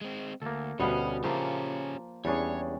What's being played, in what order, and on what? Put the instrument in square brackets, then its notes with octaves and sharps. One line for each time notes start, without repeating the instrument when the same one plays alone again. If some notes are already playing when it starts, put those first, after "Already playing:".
[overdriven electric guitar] G#3 C4
[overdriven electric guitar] D2 [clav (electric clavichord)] A#3 A4
[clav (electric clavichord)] D2 B2 F5 [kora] G3 B3 D4 [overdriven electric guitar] C#4
[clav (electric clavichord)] C#3 E5 A5 [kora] F3 A#3 [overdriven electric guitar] C#4 G4
[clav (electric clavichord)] E2 D4 G#4 [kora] G3 C#4 [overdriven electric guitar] C#5